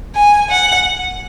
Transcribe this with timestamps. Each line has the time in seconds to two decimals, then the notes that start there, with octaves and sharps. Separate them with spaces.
0.15 G#5
0.51 F#5